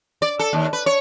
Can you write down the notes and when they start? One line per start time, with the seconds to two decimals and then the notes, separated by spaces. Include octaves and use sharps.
0.22 D5
0.39 A4
0.53 D#2
0.73 B4
0.86 C#5